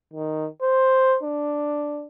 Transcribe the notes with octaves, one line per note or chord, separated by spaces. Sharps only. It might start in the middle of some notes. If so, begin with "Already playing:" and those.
D#3
C5
D4